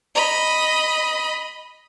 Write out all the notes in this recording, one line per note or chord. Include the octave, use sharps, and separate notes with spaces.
D#5 B5